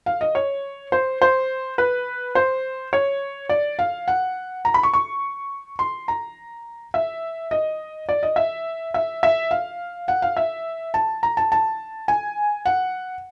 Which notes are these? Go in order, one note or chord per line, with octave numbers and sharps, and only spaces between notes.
F5
D#5
C#5
C5
C5
B4
C5
C#5
D5
F5
F#5
A#5
B5
C#6
C#6
C6
A#5
E5
D#5
D5
D#5
E5
E5
E5
F5
F#5
F5
E5
A5
A#5
A5
A5
G#5
F#5